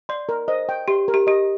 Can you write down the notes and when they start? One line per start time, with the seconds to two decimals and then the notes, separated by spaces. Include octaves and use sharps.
0.09 D5 C6
0.29 A#4
0.48 C5 D#5
0.69 G5
0.88 G4 C6
1.08 A#4
1.14 G4
1.27 G4 D#5